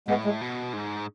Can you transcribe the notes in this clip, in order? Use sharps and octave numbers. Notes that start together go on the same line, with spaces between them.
A2 G#3 B3
G#3
B2
G#2